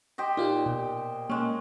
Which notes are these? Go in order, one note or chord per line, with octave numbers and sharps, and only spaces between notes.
G4 C5 D#5
A#2 D#4 F4 G4
B2
G#3 A#3 C#4